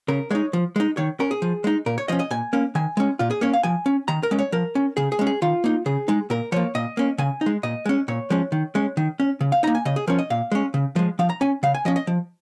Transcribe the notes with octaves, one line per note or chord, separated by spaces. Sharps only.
C#3 A#4
G#3 D#4 C#5
F3
G#3 D#4
D#3 C#5
C#4 A#4
G#4
F3
G#3 D#4
A#2 A#4
C#5
F3 C#4 D#5
D#5
A#2 G#5
A#3 C#4
D#3 G#5
G#3 C#4
A#2 F4
G#4
A#3 C#4 C#5
F5
F3 G#5
C#4
D#3 A#5
A#4
G#3 C#4
C#5
F3 A#4
C#4
C#3 G#4
G#4
G#3 C#4
G#4
D#3 F4
A#3 D#4
C#3 G#4
G#3 D#4
A#2 A#4
F3 A#3 C#5
A#2 D#5
A#3 C#4
C#3 G#5
D#4
G#3
A#2 D#5
G#3 C#4
A#2 C#5
F3 G#3 C#4
D#3
G#3 C#4
D#3
C#4
C#3
F5
A#3 D#4 A#5
G#5
C#3 D#5
G#4
F3 C#4 A#4
D#5
A#2 F5
G#3 C#4
C#3
F3 G#3
F3 F5
A#5
C#4 G#5
C#3 F5
G#5
F3 C#4 D#5
D#5
F3